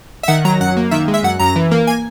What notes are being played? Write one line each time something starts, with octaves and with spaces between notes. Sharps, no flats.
E5
D#3 F#5
F#3 A#5
F#2 F#5
A#3
D#3 E5
G#3
E5
F#2 F#5
F#2 A#5
E3
A#3
G#5